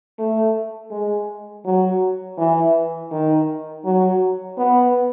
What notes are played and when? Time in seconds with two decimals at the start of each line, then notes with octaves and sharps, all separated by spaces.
0.19 A3
0.91 G#3
1.65 F#3
2.38 E3
3.11 D#3
3.85 F#3
4.58 B3